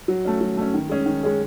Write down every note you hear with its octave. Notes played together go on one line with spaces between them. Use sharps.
F#3
A3 C#4
F#3
A3 C#4
D#3
G#3 C#4 G#4
D#3
G#3 C#4 G#4